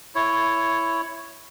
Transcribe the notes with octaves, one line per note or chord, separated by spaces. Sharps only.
E4 C#5